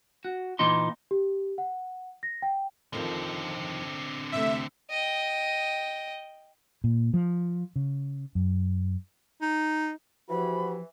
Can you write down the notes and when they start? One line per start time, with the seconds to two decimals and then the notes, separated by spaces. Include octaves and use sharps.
0.25 F#4
0.59 A#2 E3 D#4 C6
1.11 G4
1.58 F#5
2.23 A#6
2.42 G5
2.93 F2 D3 D#3 F3 C4
4.32 E2 C3 A3 E5
4.91 D#5 G5
6.84 A#2
7.14 F3
7.76 C#3
8.35 F#2
9.41 D#4
10.29 E3 F3 F#4 G4 C5 B5